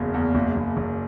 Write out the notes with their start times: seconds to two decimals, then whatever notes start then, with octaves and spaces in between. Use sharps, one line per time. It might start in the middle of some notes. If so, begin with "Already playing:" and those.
Already playing: F#1 E2 C#3
0.14 E2
0.35 F#1
0.56 F#1
0.77 F#1